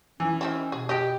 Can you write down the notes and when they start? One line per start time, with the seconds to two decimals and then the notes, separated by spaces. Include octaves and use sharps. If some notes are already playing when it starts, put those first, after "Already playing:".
0.20 E3 C#4
0.41 D#3 C4 E4
0.72 B2 G#4
0.89 G4 D#5 G5